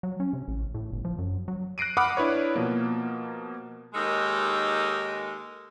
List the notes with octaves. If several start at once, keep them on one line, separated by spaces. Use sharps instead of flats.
F#3
C#4
C3
A1
A2
G1
F3
F#2
F#3
F#6 A#6 C7 D7 D#7
F#5 B5 D6 D#6 F6
D4 E4 B4 C#5
B2 F3 A#3
D#2 G#3 D#4 A4 A#4 D#5